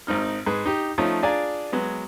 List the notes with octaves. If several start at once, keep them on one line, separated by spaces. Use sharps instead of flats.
G#1 C4 D#4 F6
G#2 G#4 B4
D#4 G4
F3 A3 C#4 D#4 F4
D4 F4 G#4 D5 G#5 A#5
F#3 G#3 B3